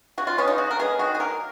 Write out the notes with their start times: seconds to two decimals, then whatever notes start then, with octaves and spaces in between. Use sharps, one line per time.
0.18 C#3 F#4
0.27 F4
0.38 G#3 B3 C#4
0.48 D#4
0.58 C#3 F#4
0.71 A#4
0.79 G#3 B3 G#4
0.99 D#3 F#4
1.15 G#4
1.20 F#3 A#3 A#4